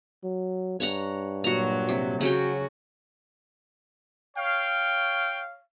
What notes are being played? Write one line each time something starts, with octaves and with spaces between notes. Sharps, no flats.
F#3
G2 C#5 F#5 A#5
A#2 F#3 F#4 A#5
C3
C#3 F#3 C#4 F#4 G5
C#5 F5 G5